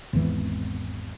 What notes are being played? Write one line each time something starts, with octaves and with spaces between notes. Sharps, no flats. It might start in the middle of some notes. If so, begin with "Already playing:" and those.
G#1 E2 E3